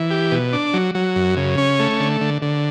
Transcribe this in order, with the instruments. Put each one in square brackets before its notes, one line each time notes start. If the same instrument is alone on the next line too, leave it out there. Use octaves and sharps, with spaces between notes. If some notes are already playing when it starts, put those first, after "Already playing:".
Already playing: [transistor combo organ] E3
G4
B2
D4
F#3
F#3
F#2
C#3
C#4
A3
D3
D3
D3